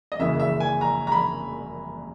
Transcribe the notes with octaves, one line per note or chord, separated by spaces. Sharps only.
D#5
F#1 F#2 C#3 E3 E5
E5
G#5
A#5
A#5
B5